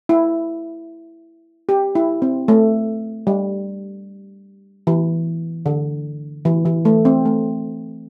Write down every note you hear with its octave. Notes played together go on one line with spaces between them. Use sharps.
E4
G4
E4
C4
A3
G3
E3
D3
E3
E3
A3
C4
A3